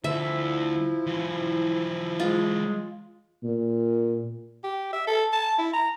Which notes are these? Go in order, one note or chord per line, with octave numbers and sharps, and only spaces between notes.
D2 F3 E4 E5
E3 F#3
G#3 F4
A#2
G4
E5
A4
A5
E4
A#5